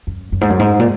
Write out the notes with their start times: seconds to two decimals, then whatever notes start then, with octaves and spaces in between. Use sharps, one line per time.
0.07 F#2
0.32 F#2
0.41 G#2
0.50 F#2
0.59 G#2
0.80 A#2